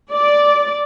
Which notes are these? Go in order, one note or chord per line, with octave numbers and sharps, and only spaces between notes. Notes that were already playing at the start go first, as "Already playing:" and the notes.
D5